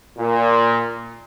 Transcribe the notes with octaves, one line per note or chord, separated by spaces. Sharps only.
A#2